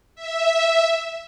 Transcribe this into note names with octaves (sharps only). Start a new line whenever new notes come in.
E5